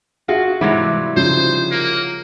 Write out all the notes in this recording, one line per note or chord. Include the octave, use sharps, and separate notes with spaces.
F4 F#4 G#4 E5
G#2 C3 E3 F#3 G3 E4
C#3 F3 D#4 C5
A#3